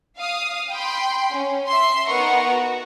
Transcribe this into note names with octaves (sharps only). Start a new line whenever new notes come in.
F5 D#6
G5 B5 C6
C#4
E5 C6
B3 D#4 A#4 F#5 A#5 C#6
F#4